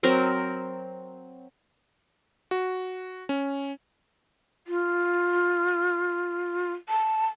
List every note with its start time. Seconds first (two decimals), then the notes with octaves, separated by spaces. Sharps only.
0.03 F#3 C4 A#4
2.51 F#4
3.29 C#4
4.66 F4
6.89 A5